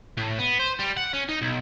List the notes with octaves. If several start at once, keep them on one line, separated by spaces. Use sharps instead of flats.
A2
B3
C5
G3
F#5
C#4
D#4
B1